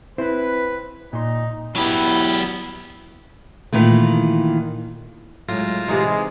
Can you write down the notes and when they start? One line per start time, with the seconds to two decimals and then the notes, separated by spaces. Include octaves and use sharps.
0.18 C4 E4 B4 C5
1.13 A#2 D#4 C6
1.76 F#3 B3 E4 G4
3.73 A#2 D#3 E3 A3
5.48 A2 F#3 G#3 F4 A#6
5.88 C3 E3 G#3 D#4